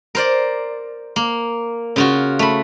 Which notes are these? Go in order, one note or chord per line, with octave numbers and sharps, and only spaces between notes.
A#4 C5 D5
A#3
C#3 F4 F#4
A3 B5